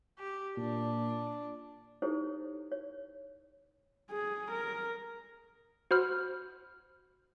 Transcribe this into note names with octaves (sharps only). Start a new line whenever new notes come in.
G4
A#2 D4
D#4 E4 G4 A4 C5 C#5
C#5
G#4
A#4
F#4 C5 B5 F6